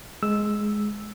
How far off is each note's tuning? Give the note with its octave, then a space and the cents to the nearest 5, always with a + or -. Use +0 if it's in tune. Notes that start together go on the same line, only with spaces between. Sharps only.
G#3 +5 E6 +0